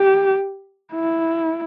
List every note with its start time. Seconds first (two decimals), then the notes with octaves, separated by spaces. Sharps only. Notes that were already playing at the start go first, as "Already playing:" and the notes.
Already playing: G4
0.94 E4